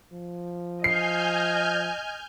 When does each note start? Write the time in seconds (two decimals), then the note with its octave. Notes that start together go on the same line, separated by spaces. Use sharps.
0.13 F3
0.84 D#5 G#5 F6 G6 C7